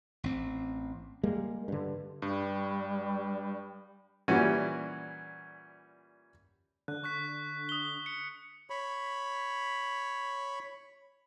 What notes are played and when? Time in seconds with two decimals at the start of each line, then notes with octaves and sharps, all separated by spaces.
0.24 A1 C4
1.23 G3 G#3 A#3
1.68 G2 D3
2.22 G2 G3
4.28 A#2 E3 G3 C#4 F#4
6.88 D3 F#6
7.04 C#6 F#6 B6
7.69 D#6 G7
8.06 C#7
8.70 C#5 B5